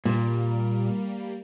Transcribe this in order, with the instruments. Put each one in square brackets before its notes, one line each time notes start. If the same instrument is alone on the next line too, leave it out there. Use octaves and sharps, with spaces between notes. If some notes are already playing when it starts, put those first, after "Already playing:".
[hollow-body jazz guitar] A#2 [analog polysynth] G3 A#3